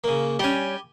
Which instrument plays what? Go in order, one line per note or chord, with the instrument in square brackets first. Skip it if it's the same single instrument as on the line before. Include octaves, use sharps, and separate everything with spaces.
[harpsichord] C#3 A#3
[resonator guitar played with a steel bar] G3 C#4 [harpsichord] G4 G#5